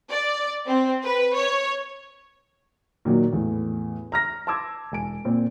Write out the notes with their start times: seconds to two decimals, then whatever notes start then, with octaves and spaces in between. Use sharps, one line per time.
0.10 D5
0.67 C4
1.05 B4
1.36 C#5
3.05 A#2 D#3 F#3
3.33 E2 A2
4.12 A#5 F6 A#6
4.47 A5 C6 D6 E6 G#6
4.92 E1 G#5 D7
5.25 A#2 C4